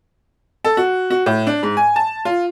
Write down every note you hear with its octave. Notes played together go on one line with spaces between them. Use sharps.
A4
F#4
F#4
A2
D4
G#2
G#5
A5
F4